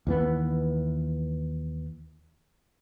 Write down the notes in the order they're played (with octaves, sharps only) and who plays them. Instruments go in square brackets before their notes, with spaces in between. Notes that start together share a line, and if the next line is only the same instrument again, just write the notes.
[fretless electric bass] D#2 E3 B3